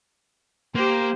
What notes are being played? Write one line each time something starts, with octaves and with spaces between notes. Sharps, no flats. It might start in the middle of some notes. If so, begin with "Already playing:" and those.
A#3 G4 C5